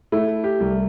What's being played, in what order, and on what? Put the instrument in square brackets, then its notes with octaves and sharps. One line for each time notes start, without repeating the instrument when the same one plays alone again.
[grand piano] A3 [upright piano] E4
[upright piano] G4
[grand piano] C2